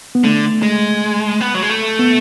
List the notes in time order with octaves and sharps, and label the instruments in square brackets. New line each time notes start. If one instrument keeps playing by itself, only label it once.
[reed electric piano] B3
[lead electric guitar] D3 [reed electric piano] A3
[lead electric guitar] G#3
B3
F#3
G#3
A3
[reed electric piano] B3